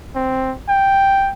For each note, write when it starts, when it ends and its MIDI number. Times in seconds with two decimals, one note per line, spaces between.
0.15 0.54 60
0.68 1.32 79